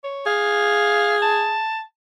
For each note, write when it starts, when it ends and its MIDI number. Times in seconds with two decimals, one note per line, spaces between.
0.04 0.26 73
0.26 1.65 68
0.26 1.16 77
1.22 1.81 81